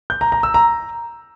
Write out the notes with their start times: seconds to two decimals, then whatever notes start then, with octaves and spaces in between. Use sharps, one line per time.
0.10 G6
0.21 A#5
0.32 A#5
0.43 E6
0.54 A#5